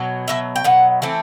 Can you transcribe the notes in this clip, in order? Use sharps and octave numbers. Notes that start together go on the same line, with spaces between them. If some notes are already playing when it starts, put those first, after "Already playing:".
Already playing: B2 F#3
B2 F#3 E5
G5
B2 F#3 F#5
E3 A3 C4